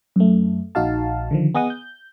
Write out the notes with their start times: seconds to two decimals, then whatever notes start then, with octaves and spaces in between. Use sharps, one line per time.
0.16 F#2 A3
0.75 A#1 D#4 F#4 F5 A5
1.31 D3 D#3 F3
1.55 B3 G#4 D#5 F#5 D#6
1.70 G6